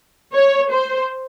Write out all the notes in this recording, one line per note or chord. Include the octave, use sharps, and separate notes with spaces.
C#5
C5